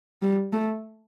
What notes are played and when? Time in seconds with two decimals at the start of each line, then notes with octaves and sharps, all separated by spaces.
0.22 G3
0.53 A3